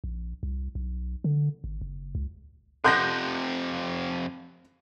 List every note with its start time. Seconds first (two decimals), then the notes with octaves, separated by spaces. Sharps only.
0.04 A#1
0.43 C2
0.75 B1
1.24 D3
1.64 G#1
1.82 F#1
2.15 C#2
2.85 F2 C3 A4 F#5 C6 F#6 G6 A#6